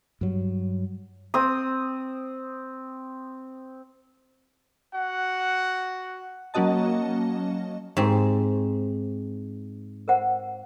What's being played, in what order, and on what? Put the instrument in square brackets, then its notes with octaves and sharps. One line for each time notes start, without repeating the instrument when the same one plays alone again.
[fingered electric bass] G2 F#3
[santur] C4 D#6
[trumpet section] F#4 F#5
[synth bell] F#3 A#3 C#4 F#4 D#5 A5
[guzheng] G#2 C4 [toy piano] G4
[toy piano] A#4 C5 F#5